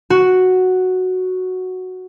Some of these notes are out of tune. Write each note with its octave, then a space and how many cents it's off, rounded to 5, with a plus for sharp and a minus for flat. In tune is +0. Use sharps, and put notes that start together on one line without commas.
F#4 +0